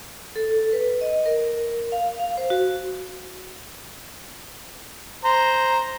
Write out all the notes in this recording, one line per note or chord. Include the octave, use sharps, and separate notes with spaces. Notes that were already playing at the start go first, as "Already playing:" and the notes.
A4
B4
D#5
A#4
F5
F5
C5
F#4
C5 A#5